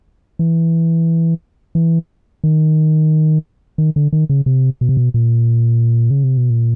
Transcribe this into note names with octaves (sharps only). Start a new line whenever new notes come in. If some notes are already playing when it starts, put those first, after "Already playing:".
E3
E3
D#3
D#3
D3
D#3
C#3
C3
B2
C3
B2
A#2
C#3
C3
B2
A#2